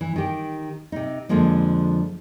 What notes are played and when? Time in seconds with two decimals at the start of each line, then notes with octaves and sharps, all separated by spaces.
0.01 E3
0.16 D#3 G4
0.92 C3 D#4
1.29 F2 D3 F3 G#3 A#3